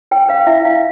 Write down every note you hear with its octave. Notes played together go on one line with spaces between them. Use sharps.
B4 G5
B4 F5
E4 E5
E4 F5